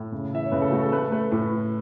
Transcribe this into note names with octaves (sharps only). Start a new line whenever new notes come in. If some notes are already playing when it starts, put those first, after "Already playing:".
Already playing: A2
C#3
E3 E5
C#5
C#3 B4
A4
A3 F#4
A4
A3 B4
A3 B4
A2 B4